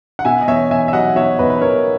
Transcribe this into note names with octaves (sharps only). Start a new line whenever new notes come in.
F#5
B2 E5 G#5
D#5
E2 C#5 E5
E2 E5 G#5
E5
F#3 D#5 F#5
B2 C#5 E5
E2 B4 D#5
B4
E2 A#4 C#5